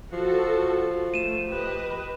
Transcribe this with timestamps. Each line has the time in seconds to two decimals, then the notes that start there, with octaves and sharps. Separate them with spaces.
0.13 F3 F#4 A4
1.14 A3 D#7 E7
1.50 G4 B4 D#5